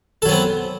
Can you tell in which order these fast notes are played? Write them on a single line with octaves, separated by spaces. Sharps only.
A4 F#3 B3 C4